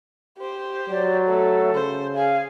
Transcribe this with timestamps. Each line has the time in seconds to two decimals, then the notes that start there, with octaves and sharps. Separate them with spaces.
0.38 G4 C5
0.89 F#3 D5
1.26 A3 A4
1.75 C#3 C5
2.15 G#4 F5 G#5